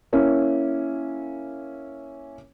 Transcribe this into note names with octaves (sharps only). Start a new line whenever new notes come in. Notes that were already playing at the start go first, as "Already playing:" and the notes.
A#3 C#4 E4